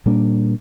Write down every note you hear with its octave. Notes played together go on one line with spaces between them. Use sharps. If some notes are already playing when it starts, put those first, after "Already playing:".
A#2 G3 A#3 D4